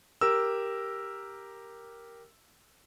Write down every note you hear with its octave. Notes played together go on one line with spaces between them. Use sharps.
G4 A#4 E6